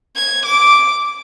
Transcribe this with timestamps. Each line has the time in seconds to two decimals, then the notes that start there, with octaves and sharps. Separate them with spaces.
0.16 G#6
0.45 D6